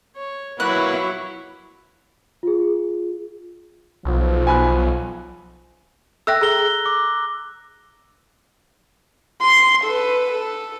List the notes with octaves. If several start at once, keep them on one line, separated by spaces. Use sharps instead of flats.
C#5
F#3 A#3 E4 F#4 B4 C#5 F#6
F4 G#4
B1 F3
G#5 B5 F#6
A4 E5 G5 E6 F#6 A#6
G#4 A4 A#5 G7
D6
C6
A4 B4
A4